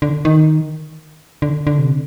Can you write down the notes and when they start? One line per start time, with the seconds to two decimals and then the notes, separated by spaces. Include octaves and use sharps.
0.02 D3
0.25 D#3
1.42 D3
1.67 D3
1.79 C3